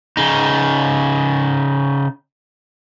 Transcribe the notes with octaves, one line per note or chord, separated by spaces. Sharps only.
C#3 D#4